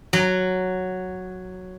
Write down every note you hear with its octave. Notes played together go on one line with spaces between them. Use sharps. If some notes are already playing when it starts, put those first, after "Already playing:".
F#3